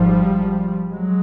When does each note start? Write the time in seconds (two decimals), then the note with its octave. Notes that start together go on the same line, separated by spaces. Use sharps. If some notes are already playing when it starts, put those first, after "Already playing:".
Already playing: G#1 G#2 F3 G3
0.90 F#3 G#3